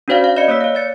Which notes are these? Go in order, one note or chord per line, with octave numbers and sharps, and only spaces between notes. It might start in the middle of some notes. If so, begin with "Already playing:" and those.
C#4 D4 F#4 C5 D5 F5
F5
D5 D#5 F5 B5 C#7
A#3 C#5 D5 E6 B6
C#5 F5
D5 A6 C#7